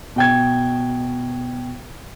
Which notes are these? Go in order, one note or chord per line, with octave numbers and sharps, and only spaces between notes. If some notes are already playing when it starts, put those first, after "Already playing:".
B2 G5 G#6